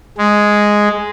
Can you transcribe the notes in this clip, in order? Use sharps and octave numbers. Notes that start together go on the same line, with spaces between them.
G#3